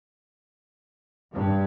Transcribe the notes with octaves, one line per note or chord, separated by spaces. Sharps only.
G2